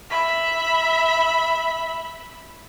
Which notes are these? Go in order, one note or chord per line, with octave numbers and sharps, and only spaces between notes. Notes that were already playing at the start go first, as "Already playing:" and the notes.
E5 B5